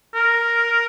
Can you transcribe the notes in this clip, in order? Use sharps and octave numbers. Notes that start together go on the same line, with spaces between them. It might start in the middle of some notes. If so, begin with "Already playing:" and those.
A#4